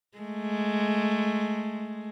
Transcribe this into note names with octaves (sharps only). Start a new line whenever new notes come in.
G#3 A3